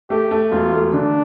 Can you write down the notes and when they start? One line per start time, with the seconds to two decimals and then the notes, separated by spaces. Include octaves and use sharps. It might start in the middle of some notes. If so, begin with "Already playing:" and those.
0.10 A3 G4
0.31 A3
0.52 E1 F4
0.73 A3
0.93 D3 D4